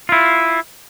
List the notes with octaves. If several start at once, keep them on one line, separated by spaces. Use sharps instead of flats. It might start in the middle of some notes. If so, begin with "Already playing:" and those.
E4 F4